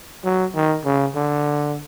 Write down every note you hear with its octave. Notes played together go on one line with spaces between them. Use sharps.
F#3
D#3
C#3
D3